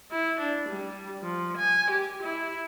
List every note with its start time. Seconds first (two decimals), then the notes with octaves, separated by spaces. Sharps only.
0.11 E4
0.40 D4
0.69 G3
1.22 F3
1.57 G#5
1.91 G4
2.23 E4